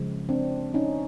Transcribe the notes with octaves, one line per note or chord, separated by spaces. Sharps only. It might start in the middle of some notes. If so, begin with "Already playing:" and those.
Already playing: C#3 F3 G#3
C4 D4
C#4 D#4